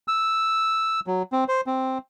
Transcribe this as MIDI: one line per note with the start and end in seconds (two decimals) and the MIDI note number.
0.08 1.00 88
1.07 1.23 54
1.32 1.44 60
1.48 1.61 72
1.67 1.98 60